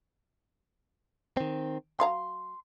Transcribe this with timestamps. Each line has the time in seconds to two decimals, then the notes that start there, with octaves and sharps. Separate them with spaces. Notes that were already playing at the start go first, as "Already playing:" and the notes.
1.37 D#3 C4
2.00 F#3 F5 A#5 C6